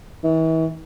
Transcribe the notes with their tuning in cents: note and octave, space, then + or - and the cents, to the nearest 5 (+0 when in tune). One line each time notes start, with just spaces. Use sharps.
E3 -40